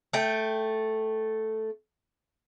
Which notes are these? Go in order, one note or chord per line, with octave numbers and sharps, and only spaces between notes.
A3 G5